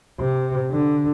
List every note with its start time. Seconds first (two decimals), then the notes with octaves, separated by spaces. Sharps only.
0.19 C3
0.71 D3